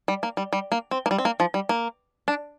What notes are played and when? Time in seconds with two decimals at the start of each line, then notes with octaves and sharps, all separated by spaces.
0.08 G3
0.23 A#3
0.37 G3
0.53 G3
0.72 A#3
0.91 C4
1.06 A#3
1.11 G3
1.18 C4
1.25 A#3
1.40 F3
1.54 G3
1.69 A#3
2.28 D4